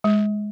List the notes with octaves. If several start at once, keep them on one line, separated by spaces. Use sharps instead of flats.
G#3